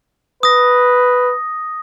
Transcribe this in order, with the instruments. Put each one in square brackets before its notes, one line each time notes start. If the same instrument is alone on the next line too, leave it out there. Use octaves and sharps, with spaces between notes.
[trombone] B4 [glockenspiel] D#6 A#6